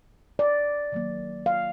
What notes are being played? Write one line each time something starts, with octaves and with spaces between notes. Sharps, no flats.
D5
D#3 F#3 A#3
F5